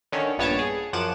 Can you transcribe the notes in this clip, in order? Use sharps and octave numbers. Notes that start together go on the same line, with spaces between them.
D3 D#3 C#4
A#1 G2 B3 C#5 A5 D7
G#4
F#2 F3 F#5 D6 D#7 E7